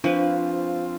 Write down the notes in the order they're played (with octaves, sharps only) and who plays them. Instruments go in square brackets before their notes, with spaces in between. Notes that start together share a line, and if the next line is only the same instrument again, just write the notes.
[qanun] F3 B4 [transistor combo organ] C4 F4 [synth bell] D4